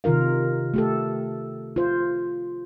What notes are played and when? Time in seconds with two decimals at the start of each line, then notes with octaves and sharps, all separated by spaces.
0.04 C3 D#3 F4 A#4 F5
0.74 A3 G4 A4
1.76 F4 C5